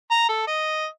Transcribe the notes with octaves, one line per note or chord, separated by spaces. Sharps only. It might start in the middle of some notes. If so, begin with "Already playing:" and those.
A#5
A4
D#5